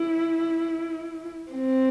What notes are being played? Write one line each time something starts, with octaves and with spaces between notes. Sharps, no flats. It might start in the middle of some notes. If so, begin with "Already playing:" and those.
Already playing: E4
C4